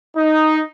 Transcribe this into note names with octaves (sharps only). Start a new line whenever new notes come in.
D#4